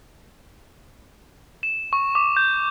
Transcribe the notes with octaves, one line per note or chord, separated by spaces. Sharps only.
E7
C#6
D6
G6